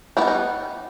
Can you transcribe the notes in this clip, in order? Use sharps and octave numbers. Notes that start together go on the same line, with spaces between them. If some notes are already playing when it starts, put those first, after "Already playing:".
G3 B3 D#4 E4
D#4